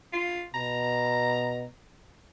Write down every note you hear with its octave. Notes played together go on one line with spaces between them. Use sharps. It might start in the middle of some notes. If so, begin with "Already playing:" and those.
F4
B2 A#5